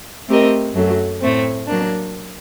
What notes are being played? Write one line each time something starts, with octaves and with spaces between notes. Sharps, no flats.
A3 C4 G4 A#4 D#5
F#2 F#3 A3
A2 A3 C4
F#3 A#3 D4